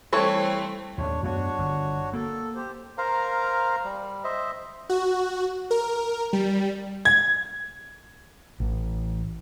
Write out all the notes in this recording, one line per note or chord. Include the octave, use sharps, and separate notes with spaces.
E3 G3 A3 C4 A4 C#5
D#2 A2 D4 C#5
F#2 A3 B3 D4 F#4 C#5
G1
A#3 A4
G4 C5
A#4 C5 F5 A#5
G3
C5 D#5 E5
F#4
A#4
G3
G#6
A1